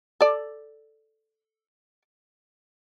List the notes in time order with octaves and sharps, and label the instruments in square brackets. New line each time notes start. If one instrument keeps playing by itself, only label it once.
[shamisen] A4 D5